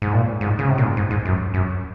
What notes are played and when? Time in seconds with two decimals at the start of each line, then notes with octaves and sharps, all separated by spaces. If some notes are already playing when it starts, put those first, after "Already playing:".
0.02 G#2
0.13 A#2
0.41 G#2
0.59 C#3
0.69 C3
0.78 A#2
0.83 G#2
0.97 G#2
1.11 G#2
1.25 F#2
1.54 F#2